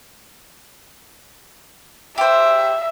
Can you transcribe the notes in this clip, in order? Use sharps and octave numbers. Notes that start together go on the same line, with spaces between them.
G4 C5 E5